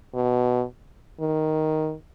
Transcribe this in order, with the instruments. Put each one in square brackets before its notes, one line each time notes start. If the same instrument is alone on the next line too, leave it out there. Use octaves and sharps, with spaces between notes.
[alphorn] B2
D#3